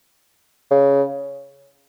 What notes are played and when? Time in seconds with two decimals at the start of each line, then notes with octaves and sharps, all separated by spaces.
0.71 C#3